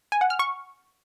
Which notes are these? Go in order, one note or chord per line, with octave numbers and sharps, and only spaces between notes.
G#5
F#5
F6
C#6